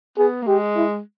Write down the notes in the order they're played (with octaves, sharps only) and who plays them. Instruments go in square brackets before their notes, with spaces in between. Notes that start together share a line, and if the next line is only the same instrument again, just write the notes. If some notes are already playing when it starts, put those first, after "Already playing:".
[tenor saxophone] B3 [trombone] G#4
[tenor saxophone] A#3
[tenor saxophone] G#3 [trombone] G4
[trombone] E4